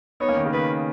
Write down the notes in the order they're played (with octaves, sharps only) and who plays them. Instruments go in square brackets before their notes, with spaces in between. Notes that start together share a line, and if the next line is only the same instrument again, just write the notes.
[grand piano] B3 D#4 [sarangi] C#5
[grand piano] A#3 C#4
D#3
C#3
[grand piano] D#3 [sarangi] B4